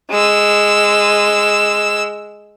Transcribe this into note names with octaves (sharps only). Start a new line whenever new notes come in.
G#3 E6